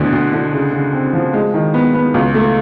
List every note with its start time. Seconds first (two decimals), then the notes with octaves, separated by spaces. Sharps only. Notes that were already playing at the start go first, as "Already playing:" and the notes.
Already playing: D2 B2 D3
0.12 D2
0.33 D3
0.53 C#3
0.73 C#3
0.93 C4
1.13 F3
1.34 G#3
1.54 D#3
1.74 B3
1.94 B3
2.14 C#2
2.34 A3